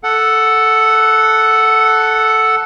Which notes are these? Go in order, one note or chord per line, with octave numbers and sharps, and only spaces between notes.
A4 F#5